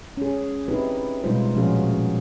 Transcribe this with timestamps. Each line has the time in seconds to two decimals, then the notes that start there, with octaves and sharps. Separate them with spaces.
0.17 C#4 G#4
0.68 C4 D#4 E4 G4 B4
1.24 B2 G3 G#3 D#4 F4 C5
1.55 A#2 F3 C#4 F#4 G#4 F5